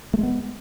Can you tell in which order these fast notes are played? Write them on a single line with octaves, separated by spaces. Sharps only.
A3 G#3 B3